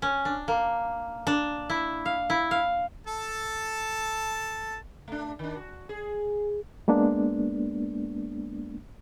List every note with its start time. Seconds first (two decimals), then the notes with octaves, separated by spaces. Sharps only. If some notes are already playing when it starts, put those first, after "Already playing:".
0.02 C#4
0.25 D4
0.48 A#3
1.27 D4
1.70 E4
2.06 F5
2.30 E4
2.51 F5
3.07 A4 A5
5.08 A3 D4
5.39 D#3 D4
5.56 F#4
5.89 G#4
6.88 G#3 A#3 B3 D4